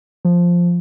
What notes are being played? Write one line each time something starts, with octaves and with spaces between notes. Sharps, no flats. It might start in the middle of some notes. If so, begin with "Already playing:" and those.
F3